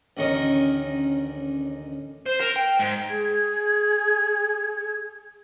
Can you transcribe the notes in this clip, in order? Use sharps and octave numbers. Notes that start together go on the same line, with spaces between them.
A1 D2 D#3 C#4 A#4 D#5
C5
A#4
G5
G#2
G#4 G#6